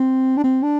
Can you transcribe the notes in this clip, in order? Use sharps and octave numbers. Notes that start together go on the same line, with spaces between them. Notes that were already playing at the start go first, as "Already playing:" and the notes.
Already playing: C4
D4
C4
D4